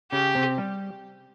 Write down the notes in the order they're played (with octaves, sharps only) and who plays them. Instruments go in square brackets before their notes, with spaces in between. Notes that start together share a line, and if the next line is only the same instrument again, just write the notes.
[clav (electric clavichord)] C#3 C#4 [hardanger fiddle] G4
[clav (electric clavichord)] C3 C4
G3